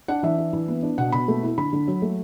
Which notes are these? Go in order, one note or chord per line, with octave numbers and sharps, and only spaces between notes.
D4 F#5
E3 E5
D4
E3
B3
D4
B2 F#5
B2 B5
A3
E4
D3 B5
D3
F#3
A3